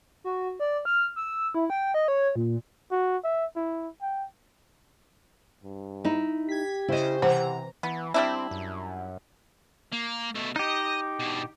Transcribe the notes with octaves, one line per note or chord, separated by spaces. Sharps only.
F#4
D5
F6
E6
E4
G5
D#5
C#5
A#2
F#4
E5
E4
G5
G2
D#4 E4
G4 G#6 B6
C#3 E4 C5 D#5
C3 E3 C5 F#5 A#5
E3 B3
G3 C4 D4 E4
F#2
A#3
B2 A3
D#4 G4 D#5
B2 D3